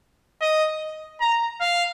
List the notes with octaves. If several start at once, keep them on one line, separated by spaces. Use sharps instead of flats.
D#5
A#5
F5